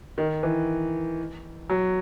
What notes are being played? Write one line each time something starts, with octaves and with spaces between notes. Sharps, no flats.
D#3
E3
F#3